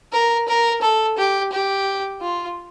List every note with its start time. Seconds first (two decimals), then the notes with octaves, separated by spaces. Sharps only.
0.13 A#4
0.48 A#4
0.82 A4
1.18 G4
1.52 G4
2.21 F4